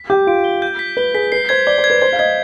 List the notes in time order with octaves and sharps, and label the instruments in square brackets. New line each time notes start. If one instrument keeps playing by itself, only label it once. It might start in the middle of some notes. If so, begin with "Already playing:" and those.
Already playing: [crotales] B6
[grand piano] G4 [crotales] G6
[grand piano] F4 [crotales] D7
[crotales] G7
G6
B6
[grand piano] B4 [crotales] G7
[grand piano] G#4 [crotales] B6
[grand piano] B4 [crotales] C7
[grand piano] C5 [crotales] G#6
[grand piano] D5 [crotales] G7
[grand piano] C5
[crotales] G#6
[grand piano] B4
[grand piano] C5 [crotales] G#6
[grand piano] F5
[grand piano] D#5 [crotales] G#6